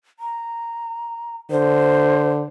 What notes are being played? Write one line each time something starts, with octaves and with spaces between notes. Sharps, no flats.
A#5
D3 C5